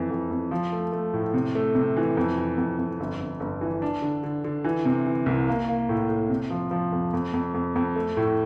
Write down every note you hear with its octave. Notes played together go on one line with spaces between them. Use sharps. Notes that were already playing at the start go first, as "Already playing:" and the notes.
Already playing: F2 E3
F2
F2
F3
A3
A3
A2
C3
A3
C3
E3
F2
E3
F2
F2
G1
G1
G1
E3
D4
D3
D3
D3
E3
C3
E3
C2
A#3
A#3
A2
A2
C3
F3
F3
F2
F2
F2
F2
F2
A3
A2